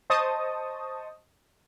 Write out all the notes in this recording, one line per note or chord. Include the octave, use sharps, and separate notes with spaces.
C5 D#5 A5 C#6 D#6